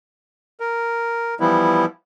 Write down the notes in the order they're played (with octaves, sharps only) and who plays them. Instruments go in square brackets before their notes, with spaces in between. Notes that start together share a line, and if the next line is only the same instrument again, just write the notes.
[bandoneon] A#4
E3 F3 G3 B3 E4